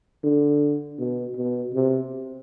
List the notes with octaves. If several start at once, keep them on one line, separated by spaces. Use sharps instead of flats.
D3
B2
B2
C3